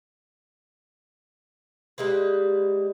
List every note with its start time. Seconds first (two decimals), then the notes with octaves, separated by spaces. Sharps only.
1.98 G3 G#3 A#3 B4